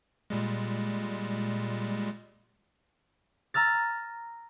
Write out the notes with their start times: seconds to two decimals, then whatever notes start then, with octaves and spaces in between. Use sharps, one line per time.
0.30 A#2 G3 G#3
3.54 A#5 E6 F6 A6